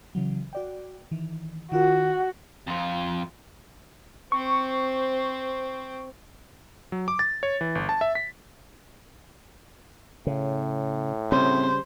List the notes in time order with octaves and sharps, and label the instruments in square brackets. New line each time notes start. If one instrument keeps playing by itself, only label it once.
[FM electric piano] C#3 E3 F#3
F#4 D5 G5
D#3 E3
[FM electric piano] D#3 F4 A#4 [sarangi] F#4
[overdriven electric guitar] F2 F4
[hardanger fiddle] C4 C5 [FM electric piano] C#6
[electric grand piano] F#3
D6
A6
C#5
E3
G1
A5
E5
B6
[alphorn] A2 [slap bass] C#3
[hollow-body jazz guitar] C#3 G3 [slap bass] C4 [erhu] C5